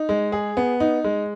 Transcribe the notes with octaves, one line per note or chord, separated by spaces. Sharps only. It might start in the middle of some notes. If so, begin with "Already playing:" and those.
Already playing: D#4
G#3
G#4
B3
D#4
G#3